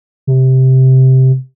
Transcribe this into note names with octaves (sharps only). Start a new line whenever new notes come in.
C3